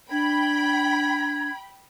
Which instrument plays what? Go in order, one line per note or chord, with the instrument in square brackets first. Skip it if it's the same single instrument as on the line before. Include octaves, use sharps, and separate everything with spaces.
[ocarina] D4 [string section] G5 B5 [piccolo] G#6